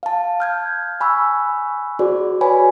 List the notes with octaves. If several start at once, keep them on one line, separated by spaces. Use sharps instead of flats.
F5 A5
F6 G6 G#6
G#5 B5 C#6 E6 F#6
F#4 G#4 C5 D5
F#4 B4 C#5 G#5 B5